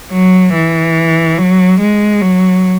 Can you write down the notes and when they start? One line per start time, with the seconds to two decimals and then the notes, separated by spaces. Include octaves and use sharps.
0.11 F#3
0.53 E3
1.38 F#3
1.80 G#3
2.21 F#3